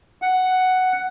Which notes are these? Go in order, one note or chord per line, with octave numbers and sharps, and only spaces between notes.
F#5